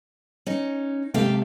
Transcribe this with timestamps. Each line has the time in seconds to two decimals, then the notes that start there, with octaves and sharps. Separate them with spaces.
0.46 C#4 D#4
1.14 C3 G#3 A#3 G4 A4 F5